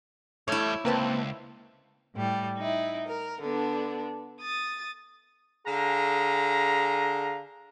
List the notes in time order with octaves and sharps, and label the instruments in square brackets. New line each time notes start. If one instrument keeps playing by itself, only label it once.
[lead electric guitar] E2 G3 [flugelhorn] A3 [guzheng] E4 C#5
[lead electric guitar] C#2 [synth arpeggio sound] A#3 B4 A5 [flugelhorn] C4
[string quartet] A2 G3
D#4 E4
A#4
D3 B3 D4
D#6 A6
[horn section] D3 G#4 F5 A#5